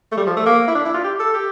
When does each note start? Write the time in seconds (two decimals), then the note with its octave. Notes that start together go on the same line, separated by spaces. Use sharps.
0.12 A3
0.17 G3
0.27 F3
0.36 A3
0.46 A#3
0.68 E4
0.75 D4
0.85 E4
0.94 F4
1.04 G4
1.19 A4
1.34 G4